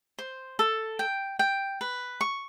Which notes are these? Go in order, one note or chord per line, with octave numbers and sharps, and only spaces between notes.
C5
A4
G5
G5
B4
C#6